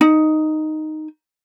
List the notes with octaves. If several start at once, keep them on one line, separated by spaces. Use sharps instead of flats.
D#4